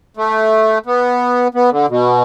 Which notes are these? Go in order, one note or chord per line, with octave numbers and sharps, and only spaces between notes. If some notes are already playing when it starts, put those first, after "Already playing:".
A3
B3
B3
D3
B2